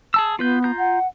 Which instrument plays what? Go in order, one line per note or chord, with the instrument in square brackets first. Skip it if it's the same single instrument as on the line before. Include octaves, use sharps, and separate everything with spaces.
[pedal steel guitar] G#4 A5 E6
[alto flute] B3 [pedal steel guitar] F4 B4 G6
[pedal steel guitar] F4 A#5 G6
[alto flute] F#5